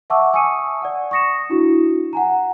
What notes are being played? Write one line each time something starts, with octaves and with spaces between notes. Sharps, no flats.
E5 F#5 A5 C#6 D6 E6
G#5 C#6 D#6 E6 C#7 D#7
D5 F#5
C#6 D#6 A#6 C#7 E7
D4 E4 F#4
F#5 G#5 A#5